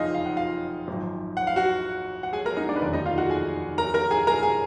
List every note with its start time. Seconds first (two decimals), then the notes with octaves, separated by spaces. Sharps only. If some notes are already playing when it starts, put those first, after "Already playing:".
Already playing: F#1 F2 D#4 F4 G#4 D#5 F5 G#5
0.14 F5
0.26 F#5
0.36 F4 F5
0.88 G#1 F#2 F3
1.37 F#5
1.47 F5
1.56 F#4 F#5
2.23 F#5
2.33 G#4 G#5
2.46 A#4 A#5
2.57 D#4 D#5
2.69 D4 D5
2.76 B4
2.81 F1 D#2 D3 F3 D4 D5
2.93 D#4 D#5
3.06 F4 F5
3.18 F#4 F#5
3.29 G#4 G#5
3.78 A#4 A#5
3.94 A#4 A#5
4.11 G#4 G#5
4.27 A#4 A#5
4.43 G#4 G#5